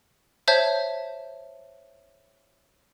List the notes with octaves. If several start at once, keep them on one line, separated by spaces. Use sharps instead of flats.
C5 C#5 E5 A5 G6